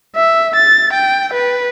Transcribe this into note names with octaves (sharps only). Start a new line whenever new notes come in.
E5
A6
G5
B4